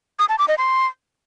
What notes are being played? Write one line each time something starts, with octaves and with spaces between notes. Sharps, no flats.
D#6
A5
D6
D#5
C6